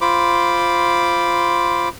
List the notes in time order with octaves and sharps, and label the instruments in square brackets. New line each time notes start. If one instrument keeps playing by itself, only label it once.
[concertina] F4 C5 B5 D6